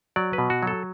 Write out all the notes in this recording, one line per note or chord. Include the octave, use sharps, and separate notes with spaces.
F#3 D5
B4
B2
F#4
F#3 A4